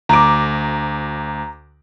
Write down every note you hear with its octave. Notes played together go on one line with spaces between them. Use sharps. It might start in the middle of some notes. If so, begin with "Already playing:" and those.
D2 A#5 D6